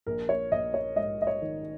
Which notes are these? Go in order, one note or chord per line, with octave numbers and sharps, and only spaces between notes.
A#1 A#4
C#5
A#1 D#5
C#5
G#2 D#5
D#5
C#5
D#3